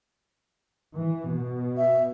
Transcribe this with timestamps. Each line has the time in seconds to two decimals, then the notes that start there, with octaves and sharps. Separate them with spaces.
0.97 E3
1.32 B2
1.77 E5